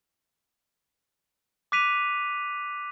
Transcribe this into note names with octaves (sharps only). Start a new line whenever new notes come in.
D6 F#6 B6 D#7 F7